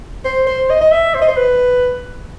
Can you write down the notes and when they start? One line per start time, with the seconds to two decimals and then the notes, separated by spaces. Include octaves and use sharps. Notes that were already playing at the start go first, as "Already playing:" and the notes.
0.25 C5
0.47 C5
0.70 D#5
0.81 D#5
0.91 E5
1.14 C5
1.22 D#5
1.28 C5
1.37 B4